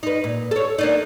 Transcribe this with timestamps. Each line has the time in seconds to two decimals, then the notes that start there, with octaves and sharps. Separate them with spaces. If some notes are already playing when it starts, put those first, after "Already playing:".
0.03 D#4 B4
0.24 A#2
0.51 A4 C#5
0.78 A#3 D4 D#4